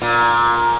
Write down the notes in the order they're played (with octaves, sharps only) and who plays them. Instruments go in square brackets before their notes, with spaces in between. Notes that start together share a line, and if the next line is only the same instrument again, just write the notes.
[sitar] A#2